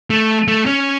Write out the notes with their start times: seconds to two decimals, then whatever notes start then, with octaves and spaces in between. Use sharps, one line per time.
0.10 A3
0.48 A3
0.66 C#4